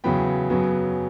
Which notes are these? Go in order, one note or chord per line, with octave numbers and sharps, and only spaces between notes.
E2 C#3 F#3 B3 G5 B5
F#2 C#3 F#3 B3